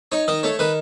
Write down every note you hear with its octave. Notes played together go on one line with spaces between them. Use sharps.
D#4 C#5
D#3 D#5
A3 C#5
D#3 B4